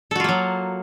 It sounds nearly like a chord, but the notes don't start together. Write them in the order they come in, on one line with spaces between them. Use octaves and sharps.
A4 F#4 F4 A#3 F#3